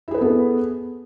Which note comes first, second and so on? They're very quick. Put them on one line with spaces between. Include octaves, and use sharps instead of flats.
E4 G#4 B4 A4 B3